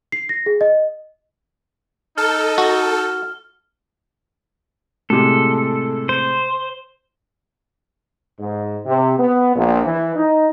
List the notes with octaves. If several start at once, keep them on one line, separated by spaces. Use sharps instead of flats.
C7
A#6
G#4
D#5
D#4 A4 F6
F#4
A2 C3 G#3 A4
C5
G#2
C3
B3
A#1
E3
D#4